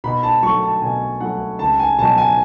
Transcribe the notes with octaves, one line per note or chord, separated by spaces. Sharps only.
B2 B5
A5
F#3 A3 C#6
A5
B2 G#5
F#3 A3 F#5
C#2 A5
G#5
B2 F#3 A5
G#5